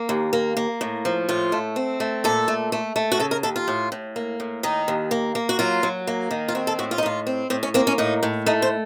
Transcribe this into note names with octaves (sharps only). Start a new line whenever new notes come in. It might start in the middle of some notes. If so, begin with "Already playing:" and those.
Already playing: A#3
D#2
A#3
A#3
A2
F3
A2 F4
A3
C4
A3
A#2 A4
A3
A3
A3
F#4
C#3 A4
A#4
D#2 A4
F4
A2
A2
A#3
A2
D#3 D#4
D#2
A#3
A#3
F#4
F#3 F4
F#3
A#3
D#3
F4
C4 F#4
A4
A2 F#4
F4
D#4
A2 F4
C4
A2 C4
C#4
A#3 C4
C#4
A2 D#4
A2
A3 D#4
C5